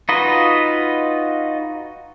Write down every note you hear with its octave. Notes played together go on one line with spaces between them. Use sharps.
D#4 F4 F#4 B4 D#5